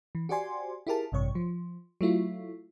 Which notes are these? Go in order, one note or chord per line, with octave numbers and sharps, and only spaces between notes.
E3
F#4 G4 C5 D5 G#5 C6
E4 F4 G4 G#4 A#4 A5
A1 G2 C3 C#5 C#6
F3
F#3 A3 E4 F4